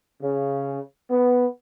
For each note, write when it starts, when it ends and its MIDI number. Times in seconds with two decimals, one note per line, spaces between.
0.22 0.78 49
1.10 1.46 59